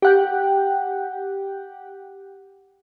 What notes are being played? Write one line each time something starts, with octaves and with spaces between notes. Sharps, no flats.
G4 F#5 G5